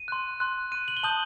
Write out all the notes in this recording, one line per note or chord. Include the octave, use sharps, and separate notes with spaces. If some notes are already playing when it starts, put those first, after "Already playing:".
Already playing: D#7
C6 F#6
C6 F#6
C6 F#6 D#7
F#7
G7
A5 D#6 G6 F#7